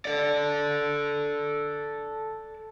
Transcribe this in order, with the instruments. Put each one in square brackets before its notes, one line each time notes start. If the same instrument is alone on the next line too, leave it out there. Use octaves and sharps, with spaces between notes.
[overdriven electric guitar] A4 D5